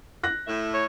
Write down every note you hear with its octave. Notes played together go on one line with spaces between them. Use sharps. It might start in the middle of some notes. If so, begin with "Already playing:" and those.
F#6 A#6
A2 E5
C#5